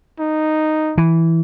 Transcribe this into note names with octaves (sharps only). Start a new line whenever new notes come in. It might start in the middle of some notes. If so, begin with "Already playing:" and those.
D#4
E3